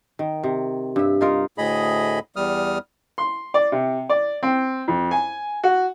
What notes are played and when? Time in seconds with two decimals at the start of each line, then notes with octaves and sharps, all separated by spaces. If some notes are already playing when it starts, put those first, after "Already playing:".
0.19 D#3
0.44 C3
0.96 G2 E5
1.21 D#4 F4 A#4
1.58 D2 A2 G#4 D#5 B5
2.36 E2 G3 D#6 F6
3.18 C6
3.54 D5
3.72 C3
4.09 D5
4.43 C4
4.88 F2
5.11 G#5
5.63 F#4